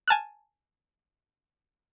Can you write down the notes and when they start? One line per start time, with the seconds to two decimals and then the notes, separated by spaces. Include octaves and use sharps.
0.08 G#5 A5 F6 F#6